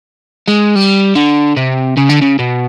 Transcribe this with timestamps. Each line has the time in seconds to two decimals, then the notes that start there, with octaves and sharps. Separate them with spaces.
0.48 G#3
0.75 G3
1.15 D3
1.57 C3
1.97 C#3
2.10 D3
2.22 C#3
2.39 B2